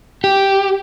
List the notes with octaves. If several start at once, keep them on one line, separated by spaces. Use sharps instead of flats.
G4